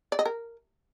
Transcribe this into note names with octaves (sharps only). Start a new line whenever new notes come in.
D5
D#5
A#4